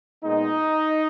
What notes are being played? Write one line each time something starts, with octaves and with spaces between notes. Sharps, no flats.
A#2 G#3 B3 D#4